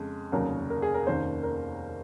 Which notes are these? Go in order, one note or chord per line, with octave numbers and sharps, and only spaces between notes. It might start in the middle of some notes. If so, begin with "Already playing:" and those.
Already playing: F2 C#3 G#3
F1 D#2 C#3 F#3 A#4
A#4
G#4
A#4
F1 D#2 D#3 A#3 C#4 C5
A#4